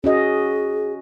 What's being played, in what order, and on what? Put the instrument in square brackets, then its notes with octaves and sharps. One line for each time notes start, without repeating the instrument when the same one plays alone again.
[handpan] C#4 F#4 D#5 [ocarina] G#4